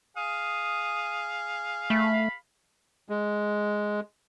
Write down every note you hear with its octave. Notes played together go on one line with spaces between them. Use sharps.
G#4 F5 D#6
A3 B5
G#3